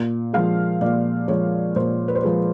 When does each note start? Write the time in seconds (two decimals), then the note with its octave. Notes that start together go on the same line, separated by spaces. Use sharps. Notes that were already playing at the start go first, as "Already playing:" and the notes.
Already playing: A#2
0.33 F3 G#3 F5
0.81 A#2 D5
1.28 F3 G#3 C#5
1.76 A#2 C5
2.08 B4
2.15 C5
2.23 F3 G#3 B4